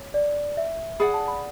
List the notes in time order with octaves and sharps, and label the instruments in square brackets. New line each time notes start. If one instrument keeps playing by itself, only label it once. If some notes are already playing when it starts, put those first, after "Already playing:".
Already playing: [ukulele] C#5
[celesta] D5
E5
[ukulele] G#4 D5 F#5 [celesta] B5
[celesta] A5
B5